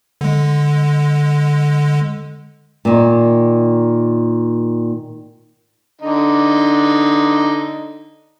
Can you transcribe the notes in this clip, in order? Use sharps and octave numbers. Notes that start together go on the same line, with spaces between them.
D3 G#3
A#2 D#3
D3 D#4